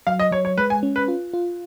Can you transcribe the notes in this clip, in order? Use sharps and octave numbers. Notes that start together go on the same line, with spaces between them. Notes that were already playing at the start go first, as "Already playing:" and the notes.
F#3 F5
D#5
F#3 C#5
C#5
G#3 B4
G#5
C#4
B4
F4
F4